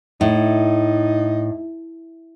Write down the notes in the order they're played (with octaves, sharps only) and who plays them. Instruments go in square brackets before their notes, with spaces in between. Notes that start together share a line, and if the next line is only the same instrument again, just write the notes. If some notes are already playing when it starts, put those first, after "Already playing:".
[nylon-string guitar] A2 [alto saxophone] D#4